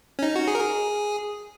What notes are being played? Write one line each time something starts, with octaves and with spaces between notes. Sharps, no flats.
C#4
D#4
F#4
G#4
A#4
G#4